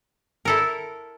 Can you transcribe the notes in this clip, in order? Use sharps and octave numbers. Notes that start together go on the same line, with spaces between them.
E4 A4 A#4